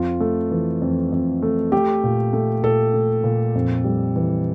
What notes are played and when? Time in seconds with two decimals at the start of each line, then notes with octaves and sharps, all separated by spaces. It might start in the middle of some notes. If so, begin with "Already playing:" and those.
Already playing: F2 F4
0.20 A3
0.51 E3
0.82 F2
1.12 F2
1.42 A3
1.72 A3 G4
2.03 A#2
2.33 A3
2.63 A#2 A4
2.93 A3
3.24 A#2
3.55 F2
3.84 G3
4.16 E3